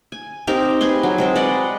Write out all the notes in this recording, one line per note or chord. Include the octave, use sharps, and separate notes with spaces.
G#5
C4 D#4 G4 A#4
G#4 B4 G#5 C6
F#3
G#3 C4 G#4
B4 D5 D#5 F#5